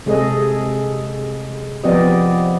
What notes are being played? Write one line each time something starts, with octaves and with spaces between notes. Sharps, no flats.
C3 G#3 G#4 A4 D#5
F3 B3 C4 G4 D5 D#5